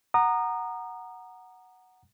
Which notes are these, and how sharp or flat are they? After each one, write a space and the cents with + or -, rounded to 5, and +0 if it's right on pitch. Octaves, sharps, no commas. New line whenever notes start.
F#5 +0 A#5 +0 D#6 -30